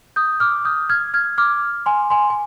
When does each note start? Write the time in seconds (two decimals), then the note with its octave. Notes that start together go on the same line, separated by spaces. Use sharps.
0.16 D#6 G6
0.40 D6 F6
0.65 D#6 G6
0.90 F6 G#6
1.14 F6 G#6
1.38 D6 F6
1.86 G#5 C6
2.10 G#5 C6
2.30 G#5